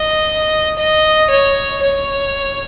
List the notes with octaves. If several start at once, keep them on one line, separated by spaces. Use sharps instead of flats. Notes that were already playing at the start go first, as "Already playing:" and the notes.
Already playing: D#5
D#5
C#5
C#5